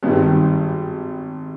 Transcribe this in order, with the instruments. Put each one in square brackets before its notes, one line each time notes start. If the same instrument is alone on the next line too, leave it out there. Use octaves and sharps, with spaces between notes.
[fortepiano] G#1 G2 D#3 G3